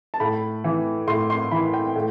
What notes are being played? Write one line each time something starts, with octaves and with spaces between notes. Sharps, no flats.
A5
A2 B5
E3
A2 C6
C6
E3 B5
G5
A2